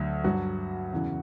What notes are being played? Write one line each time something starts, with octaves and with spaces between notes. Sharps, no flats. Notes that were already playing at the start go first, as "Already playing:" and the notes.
Already playing: D2 D3 F#3
G2 F#3 F#4
E2 C#3 E3